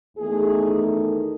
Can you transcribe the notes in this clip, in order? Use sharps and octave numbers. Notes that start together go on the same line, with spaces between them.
E2 D#3 A3 G#4